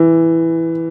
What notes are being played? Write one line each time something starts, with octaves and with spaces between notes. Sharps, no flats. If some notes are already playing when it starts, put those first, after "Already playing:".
Already playing: E3